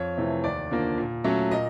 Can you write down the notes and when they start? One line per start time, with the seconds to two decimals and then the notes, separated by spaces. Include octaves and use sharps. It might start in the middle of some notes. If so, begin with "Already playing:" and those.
Already playing: F2 C#5
0.17 C3 E3 A3
0.44 D#2 D5
0.71 D3 F3 A#3
0.98 A#2
1.24 F#3 A3 C#4
1.51 A#2 D#5